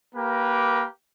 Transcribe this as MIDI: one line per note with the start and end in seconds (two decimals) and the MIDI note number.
0.15 0.85 58
0.15 0.85 67
0.15 0.85 70
0.15 0.85 71